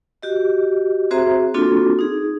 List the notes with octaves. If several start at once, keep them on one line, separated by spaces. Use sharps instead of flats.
F#4 G4 D#5
C4 F#4 G#4 C5 E5 A#5
A#3 C4 D4 F4 F#4 A4
D#4 G#4